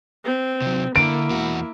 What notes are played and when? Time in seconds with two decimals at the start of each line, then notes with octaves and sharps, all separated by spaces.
0.25 C4
0.62 C3 F#3
0.96 D3 A#3 E4 D7
1.30 E2 F#4